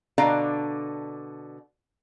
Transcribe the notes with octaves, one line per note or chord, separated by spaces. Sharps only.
B2 D3 D4 D5 F5 A#5